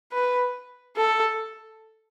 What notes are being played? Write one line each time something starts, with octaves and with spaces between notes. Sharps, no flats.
B4
A4